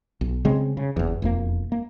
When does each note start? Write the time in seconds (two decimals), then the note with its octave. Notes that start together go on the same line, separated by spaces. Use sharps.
0.21 B1
0.45 C#3 G3 G#3 C4
0.77 C#3
0.97 F#1 E2
1.22 E1 F2 A#3
1.72 A#3